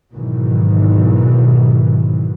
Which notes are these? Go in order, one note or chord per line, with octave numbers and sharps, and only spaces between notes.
G#2 B2 D#3 E3 F#3